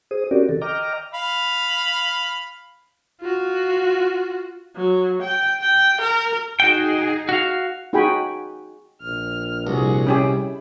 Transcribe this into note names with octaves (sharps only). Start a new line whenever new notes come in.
G#4 C5 D#6
C4 C#4 F#4 G4 A#4 D5
D#3 A4
D#5 G5 A#5 D6 F6
F5 B5
F4 F#4
F#3
G5
G5
A#4
D#4 F#4 G#4 G5
F#4 F5
D#4 F#4 G#4 G5 G#5 B5
A#1 F6
C2 F#4 G#4
C#4 E4 G4 G#4